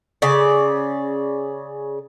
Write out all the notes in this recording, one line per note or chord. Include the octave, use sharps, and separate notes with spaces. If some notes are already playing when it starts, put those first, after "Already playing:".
C#3 D5